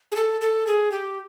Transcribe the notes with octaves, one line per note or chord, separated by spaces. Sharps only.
G#4
A4
A4
G#4
G4